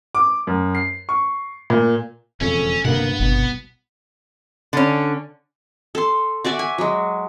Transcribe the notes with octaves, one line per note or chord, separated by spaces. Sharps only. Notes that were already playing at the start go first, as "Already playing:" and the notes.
D6
F#2
C7
C#6
A#2
E1 F2 C#3 C#4 A4
D#1 D2 G2 C3 A#3 B3 F#5
G1 C2 B2
D3 C#4
A4 C6
F#4 D5 E5 G#5
G#5
F#3 G#3